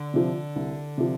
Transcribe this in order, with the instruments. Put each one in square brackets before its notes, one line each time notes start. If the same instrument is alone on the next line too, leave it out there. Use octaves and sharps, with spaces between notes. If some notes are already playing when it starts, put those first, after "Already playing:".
Already playing: [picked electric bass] D3
[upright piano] C3 F3
C2
C3 F3